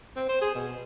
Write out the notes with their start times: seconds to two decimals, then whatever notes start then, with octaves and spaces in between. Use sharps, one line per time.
0.16 C4
0.29 C5
0.41 G#4
0.55 B2